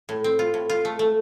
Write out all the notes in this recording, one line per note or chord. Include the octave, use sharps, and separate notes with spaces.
A2
C4
F4
A2
F4
A3
A3